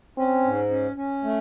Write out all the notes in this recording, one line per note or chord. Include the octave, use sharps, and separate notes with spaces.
C4 C#4
G#2
C#4
C#4
A3